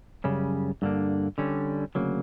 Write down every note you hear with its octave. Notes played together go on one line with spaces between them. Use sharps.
F#2 C#3 G3 C#4
G2 D3 A#3
D3 G3 C#4
D2 C#3 F#3 A#3